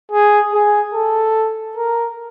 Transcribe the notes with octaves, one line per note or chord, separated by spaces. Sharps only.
G#4
G#4
A4
A#4